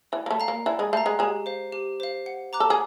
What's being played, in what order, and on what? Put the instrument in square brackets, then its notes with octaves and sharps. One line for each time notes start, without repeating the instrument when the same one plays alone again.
[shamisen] E3 [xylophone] D5
[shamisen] A#3
A3
[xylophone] F5 A#5
[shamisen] A#3
[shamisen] E3 E4 [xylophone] D5
[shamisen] G#3 G#4
[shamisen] A3 A4 [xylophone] F5 A#5
[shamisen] G#3 G#4
[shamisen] G#3 G#4 [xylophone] G4
[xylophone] C5 F5
G4
C5 F5
F#5
A#5 D6 F#6
[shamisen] A4
G#4